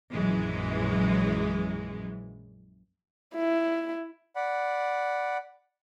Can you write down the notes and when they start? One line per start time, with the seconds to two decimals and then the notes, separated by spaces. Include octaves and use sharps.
0.13 A#1 F#2 E3 F#3 G#3
3.36 E4
4.36 D5 F#5 B5